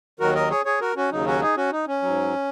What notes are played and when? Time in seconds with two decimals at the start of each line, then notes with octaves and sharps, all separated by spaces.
0.19 D#2 D#3 F#3 F#4 A#4
0.35 A#4 D#5
0.50 G#4 C#5
0.65 G#4 C#5
0.81 F#4 A#4
0.96 C#4 F#4
1.12 D#2 C#3 F#3 D#4
1.27 C#4 F#4
1.41 D#4 G#4
1.57 C#4 F#4
1.72 D#4
1.87 C#4
2.02 G#2 F#3